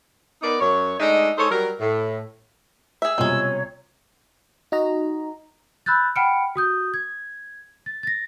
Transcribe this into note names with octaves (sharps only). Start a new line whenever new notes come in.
B3 D#4 A#4 D5
F#2 C#5
G#3 A3 D4 D#4
G#3 D#4 A4 C5 C#5
F#3 G3 A#4
A2
G#4 E5 E6
C2 B2 G#3 C#4 F4 C#5
D#4 F#4 D#5 A#5
B5 E6 F#6 G6 A6
F#5 G5 B5 F6 C#7 D7
F#4 D#6 G6
G#6
A6
A6 A#6